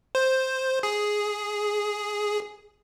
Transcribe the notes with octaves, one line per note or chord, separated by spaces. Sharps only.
C5
G#4